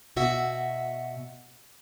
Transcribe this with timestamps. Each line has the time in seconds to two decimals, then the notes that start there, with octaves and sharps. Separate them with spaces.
0.16 B2 F#4 E5